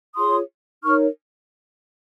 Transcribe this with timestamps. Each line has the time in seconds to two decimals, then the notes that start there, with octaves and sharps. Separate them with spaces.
0.16 F4 G#4 C#5 C6 D#6
0.83 D#4 A#4 C#5 C#6 F6